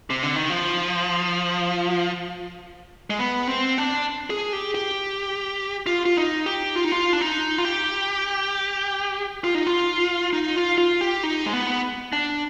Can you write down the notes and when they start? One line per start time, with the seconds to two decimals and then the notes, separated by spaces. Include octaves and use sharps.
0.10 C3
0.23 D3
0.36 D#3
0.50 F3
3.10 G#3
3.19 B3
3.47 C4
3.78 D4
4.30 G#4
4.53 G4
4.75 G4
5.87 F4
6.06 F4
6.17 D#4
6.46 G4
6.76 F4
6.84 D#4
6.92 F4
7.13 D4
7.21 D#4
7.58 F4
7.65 G4
9.44 F4
9.55 D#4
9.67 F4
10.33 D#4
10.56 F4
10.78 F4
11.01 G4
11.23 D#4
11.46 G#3
11.53 B3
12.13 D4